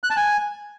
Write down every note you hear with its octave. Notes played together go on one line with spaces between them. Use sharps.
F#6
A5
G#5